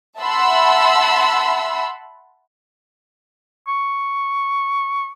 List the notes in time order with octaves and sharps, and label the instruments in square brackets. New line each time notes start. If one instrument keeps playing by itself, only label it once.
[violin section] E5 F#5 A5 B5 C6 E6
[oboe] C#6